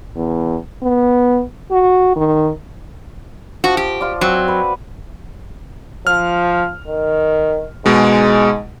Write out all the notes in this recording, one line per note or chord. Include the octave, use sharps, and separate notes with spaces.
E2
B3
F#4
D#3
F3 F#4
G4
F4 D5
F#3 C4 F#4
B4
F3 F6
D#3
G#2 B2 G#3